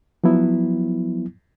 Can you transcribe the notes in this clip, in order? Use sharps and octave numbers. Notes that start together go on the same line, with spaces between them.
F3 F#3 B3 E4